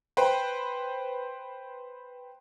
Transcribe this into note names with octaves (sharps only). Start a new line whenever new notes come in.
B4 C5 G5